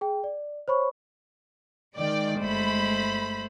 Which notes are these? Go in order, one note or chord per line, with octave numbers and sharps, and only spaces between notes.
G#4 G5
D5
C5 C#5 B5 C#6
D#3 G#3 D5 G5
G1 A3 C5 B5